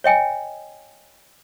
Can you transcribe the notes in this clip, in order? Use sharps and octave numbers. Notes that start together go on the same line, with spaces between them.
C#5 D#5 G5 G#5